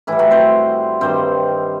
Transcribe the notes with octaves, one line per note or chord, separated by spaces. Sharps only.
A2 E3 G3 E4
F#3 F#4
C4 C5
G2 D#3 G3 C4 C5